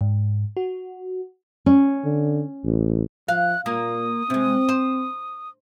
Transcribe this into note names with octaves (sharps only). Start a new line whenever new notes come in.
G#2
F#4
C#4
D3
A1
F3 F5 F#6
A#2 A#3 D#6
C3 G#3 C4
C5